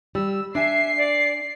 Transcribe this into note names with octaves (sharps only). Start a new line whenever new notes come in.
G3 E6
D4 E5 G#5 C7
D5